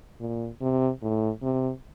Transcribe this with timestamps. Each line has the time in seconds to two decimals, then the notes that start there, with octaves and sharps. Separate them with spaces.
0.20 A#2
0.61 C3
1.02 A2
1.42 C3